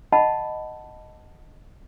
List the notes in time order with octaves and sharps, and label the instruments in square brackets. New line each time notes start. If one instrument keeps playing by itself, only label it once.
[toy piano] D#5 E5 F#5 A5 B5